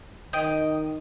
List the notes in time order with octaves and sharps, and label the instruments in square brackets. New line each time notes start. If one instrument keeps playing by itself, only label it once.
[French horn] D#3 [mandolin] D#5 [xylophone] G5 G6